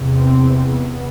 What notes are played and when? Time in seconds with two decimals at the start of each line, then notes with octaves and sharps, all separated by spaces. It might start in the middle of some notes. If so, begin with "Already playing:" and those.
Already playing: E2 C3
0.16 C4
0.69 B3